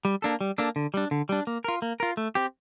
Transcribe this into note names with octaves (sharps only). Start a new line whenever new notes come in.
G3
A#3 D4 A4
G3
A#3 D4 A4
D3
G3 D4
D3
G3 D4
A#3
F4 A#4
A#3
F4 A#4
A3
C4 G4